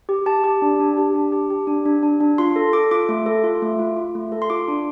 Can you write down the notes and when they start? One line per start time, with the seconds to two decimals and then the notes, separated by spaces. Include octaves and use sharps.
0.09 G4
0.26 G4 A5
0.44 G4
0.62 D4
0.80 D4
0.97 G4
1.15 D4
1.32 G4
1.50 G4
1.67 D4
1.86 D4
2.03 D4
2.20 D4
2.38 F4 C6
2.56 A4
2.73 A4 D6
2.91 F4 D6
3.09 A3
3.26 A4
3.44 F4
3.62 A3
3.79 F4
3.97 F4
4.15 A3
4.32 A4
4.42 C6
4.50 F4 D6
4.68 D4